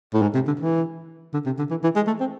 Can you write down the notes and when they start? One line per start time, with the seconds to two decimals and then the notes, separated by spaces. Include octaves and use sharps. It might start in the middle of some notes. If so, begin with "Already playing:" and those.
0.14 A2
0.22 G#2
0.34 C3
0.47 D3
0.60 E3
1.33 D3
1.46 C3
1.59 D3
1.70 E3
1.84 E3
1.96 G#3
2.07 A3
2.20 C4